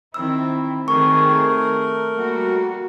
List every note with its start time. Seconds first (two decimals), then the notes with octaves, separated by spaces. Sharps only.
0.14 D#3 C4 E4 E6
0.88 D#3 A3 C4 G#4 A#4 C#6
2.14 G3 A#3 F#4